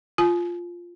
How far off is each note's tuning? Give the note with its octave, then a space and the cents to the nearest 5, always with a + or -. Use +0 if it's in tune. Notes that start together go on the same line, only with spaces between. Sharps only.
F4 +0 G#5 +40